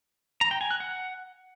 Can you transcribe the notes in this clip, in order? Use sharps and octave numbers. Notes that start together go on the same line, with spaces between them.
A#5
G5
G#5
F#6
F#5